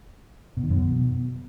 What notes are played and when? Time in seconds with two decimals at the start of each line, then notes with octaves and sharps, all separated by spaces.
0.57 B2
0.63 D#3
0.69 F#2
0.76 B2